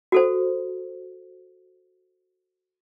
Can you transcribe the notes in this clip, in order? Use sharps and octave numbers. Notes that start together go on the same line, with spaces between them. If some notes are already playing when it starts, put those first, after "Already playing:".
F#4 A4 C5